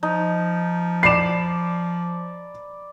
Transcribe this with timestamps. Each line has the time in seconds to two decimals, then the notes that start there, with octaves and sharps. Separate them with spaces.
0.03 F3 D#4
1.03 D5 B5 C7 E7